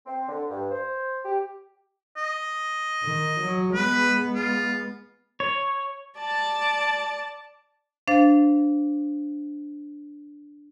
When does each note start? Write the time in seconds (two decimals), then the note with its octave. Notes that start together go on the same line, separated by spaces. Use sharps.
0.06 C4
0.29 D3
0.50 G2
0.71 C5
1.25 G4
2.17 D#5
3.03 D#3
3.40 F#3
3.74 G#3 B3 B4
4.35 F4
5.40 C#5
6.18 D5 A5
8.08 D4 C5 F5 A6